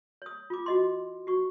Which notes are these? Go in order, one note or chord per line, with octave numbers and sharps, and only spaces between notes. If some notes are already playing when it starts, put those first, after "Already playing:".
C#5 D#6
F4 D6
F#4 D#5 C6
F#4 C#6